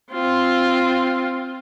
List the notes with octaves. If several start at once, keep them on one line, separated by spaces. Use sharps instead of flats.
C4 F4